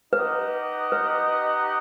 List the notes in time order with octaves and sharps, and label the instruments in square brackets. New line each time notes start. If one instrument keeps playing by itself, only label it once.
[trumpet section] D#4 G4 D#5 F#5 [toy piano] B4
[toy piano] B4